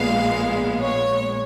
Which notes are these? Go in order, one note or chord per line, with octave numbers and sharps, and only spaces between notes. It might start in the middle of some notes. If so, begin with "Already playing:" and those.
Already playing: A#1 A#2 G#3 B3 F5
C#5